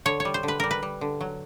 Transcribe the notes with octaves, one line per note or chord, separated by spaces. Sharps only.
D3 C#5
C#5
G3
C5
D3
B4
G3 A#4
B4
G3
D3
F#3